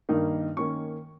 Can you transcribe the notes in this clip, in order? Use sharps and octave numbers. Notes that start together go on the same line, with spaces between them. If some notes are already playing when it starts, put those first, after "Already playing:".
G2 D#3 A#3 D#4
D#3 A#3 C#4 C#6